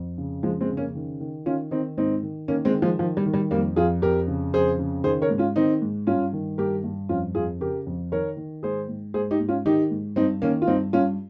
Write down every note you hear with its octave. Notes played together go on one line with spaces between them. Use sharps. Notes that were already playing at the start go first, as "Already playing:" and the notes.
Already playing: F2
C#3
F2 F3 G#3
G#3 C4
C#3
A#3 C#4
D#3
D#3
D#3 C#4 F4
D#3 C4 D#4
G#2 C4 D#4
D#3
D#3 A#3 C#4
G#3 C4
D#3
F3 G#3
D#3 F3
G3
D#3
G3
F2 G3 A#3
F2 F4 G#4
F2 G4 A#4
C#3
F2 G#4 C5
C#3
D#3 G#4 C5
A#4 C#5
G#2
C#4 F4
D#3 C4 D#4
G#2
G2 C#4 F4
D#3
G2 G4 A#4
G2
F2 C#4 F4
F2 F4 G#4
C#3 G4 A#4
F2
D#3 A#4 C#5
D#3
G#2 G#4 C5
G#2
G#2 G#4 C5
D#4 G4
G#2
C#4 F4
D#3 D#4 G4
G#2
G2 C4 D#4
D#3 A#3 C#4
F4
G2 C4 D#4
G2 C#4 F4